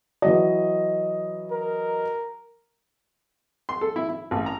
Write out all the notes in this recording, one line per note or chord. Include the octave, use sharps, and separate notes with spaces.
E3 F#3 D#5
A#4
C6
A4
E4
E4
A1
A#5